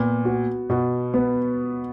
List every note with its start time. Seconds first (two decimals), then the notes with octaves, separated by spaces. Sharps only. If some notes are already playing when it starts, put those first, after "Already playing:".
Already playing: A#2 B3
0.25 F#4
0.70 B2 F#4
1.14 B3